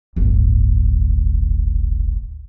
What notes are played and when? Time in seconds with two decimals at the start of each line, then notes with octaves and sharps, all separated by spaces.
0.16 D1 G1